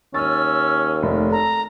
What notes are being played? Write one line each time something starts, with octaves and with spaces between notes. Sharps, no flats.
D#2 C#4 E6 F6 A6
F1 A3
A4 A#5